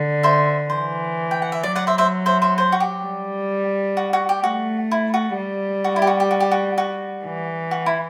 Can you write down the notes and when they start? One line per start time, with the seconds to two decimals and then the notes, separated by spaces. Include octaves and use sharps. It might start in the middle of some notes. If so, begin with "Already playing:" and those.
Already playing: D3
0.23 C5 E5
0.70 E3 C5
1.31 G5
1.42 F#5
1.52 E5
1.63 F#3 D5
1.75 D5 F#5
1.87 C5 E5
1.98 C5 E5
2.26 C5 E5
2.42 C5 E5
2.58 C5
2.72 F#4
2.80 G4
3.04 G3
3.97 F#4
4.13 F#4
4.29 G4
4.44 A3 F#4
4.91 E4
5.14 F#4
5.37 G3
5.84 F#4
5.96 E4
6.02 G4
6.07 F#4
6.20 G4
6.31 F#4
6.40 G4
6.51 F#4
6.78 F#4
7.25 E3
7.71 F#4
7.86 E4